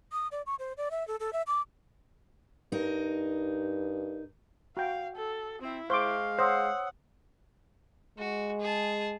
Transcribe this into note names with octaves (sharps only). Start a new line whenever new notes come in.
D#6
D5
C#6
C5
D5
E5
A4
A4
E5
D6
G2 D#4 A#4
F#4 F5 G5
A4
C4 E4
G#3 C5 F5 G5 C#6 D6 G7
C5 C#5 F#5 D#6 E6
G#3 F#4
G#4 A5